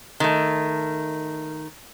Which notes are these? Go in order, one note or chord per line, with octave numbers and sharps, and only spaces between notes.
D#3 A3